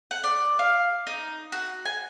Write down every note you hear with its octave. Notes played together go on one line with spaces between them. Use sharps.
F#5
D5
F5
D#4
F#4
G#5